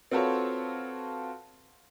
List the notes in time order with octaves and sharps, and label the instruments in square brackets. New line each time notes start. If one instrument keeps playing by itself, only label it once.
[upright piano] C4 F4 F#4 A4 B4 C#5